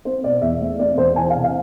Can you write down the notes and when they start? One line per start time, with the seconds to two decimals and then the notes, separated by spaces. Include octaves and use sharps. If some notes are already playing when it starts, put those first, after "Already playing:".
0.05 C4 C5
0.23 B2 D5
0.42 E2 E5
0.61 A3 E5
0.79 C4 D5
0.98 E2 C5
1.16 E3 G#5
1.30 F5
1.35 C3
1.44 F5